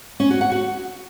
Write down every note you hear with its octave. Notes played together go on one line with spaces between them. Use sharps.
C#4
F#4
F#5
F#4